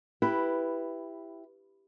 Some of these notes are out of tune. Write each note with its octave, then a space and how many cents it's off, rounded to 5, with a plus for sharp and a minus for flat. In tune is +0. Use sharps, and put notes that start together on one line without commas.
E4 +10 G4 +0 B4 +0